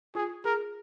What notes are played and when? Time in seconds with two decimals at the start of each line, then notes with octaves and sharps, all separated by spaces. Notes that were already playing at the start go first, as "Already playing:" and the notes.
0.15 F4 G#4
0.44 G#4 A#4